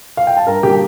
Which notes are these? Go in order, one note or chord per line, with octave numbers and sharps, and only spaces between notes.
F5
G5
A5
G2 A#4 A#5
D3 G3 A#3 G4 G5